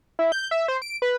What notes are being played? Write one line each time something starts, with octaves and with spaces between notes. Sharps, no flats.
E4
G6
E5
C5
D7
B4